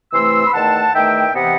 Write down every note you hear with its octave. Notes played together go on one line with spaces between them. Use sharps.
C3 E3 A3 C6 E6
B5
E2 D#3 A3 F#5 A5
E2 D#3 A3 E5 G5
C3 E3 B3 D#5 F#5